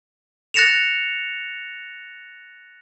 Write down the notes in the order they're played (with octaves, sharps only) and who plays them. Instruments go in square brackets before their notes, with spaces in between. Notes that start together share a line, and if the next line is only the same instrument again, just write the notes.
[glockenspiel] F#6 A6 A#6 C#7 E7 F7